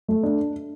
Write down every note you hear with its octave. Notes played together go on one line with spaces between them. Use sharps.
A3
D4